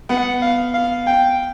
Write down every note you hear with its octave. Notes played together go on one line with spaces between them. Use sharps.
B3 F#5
F5
F5
G5